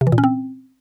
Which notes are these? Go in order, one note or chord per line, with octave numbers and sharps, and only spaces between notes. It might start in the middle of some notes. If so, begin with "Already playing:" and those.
C3
E3
A#2
C#4
C4